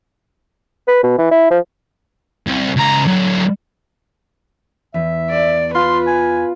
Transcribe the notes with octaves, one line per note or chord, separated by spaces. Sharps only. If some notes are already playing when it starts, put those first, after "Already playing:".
B4
B2
E3
E4
F3
C2
C#2 A#5
D3 F#3
E2 E5
D5
F4 B4 C6
G#5